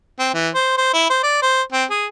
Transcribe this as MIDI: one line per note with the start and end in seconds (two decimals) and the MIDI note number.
0.19 0.29 60
0.34 0.50 52
0.55 0.74 72
0.77 0.91 72
0.94 1.07 64
1.10 1.20 72
1.24 1.40 74
1.43 1.62 72
1.72 1.85 60
1.91 2.06 68